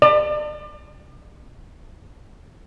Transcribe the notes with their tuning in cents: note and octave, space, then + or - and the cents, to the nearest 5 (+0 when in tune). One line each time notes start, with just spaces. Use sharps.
D5 +40